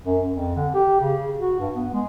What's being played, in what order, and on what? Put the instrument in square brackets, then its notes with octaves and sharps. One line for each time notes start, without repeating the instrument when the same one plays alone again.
[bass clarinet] F#2
F2
D3
G4
C#3
F#4
G2
B3
G#3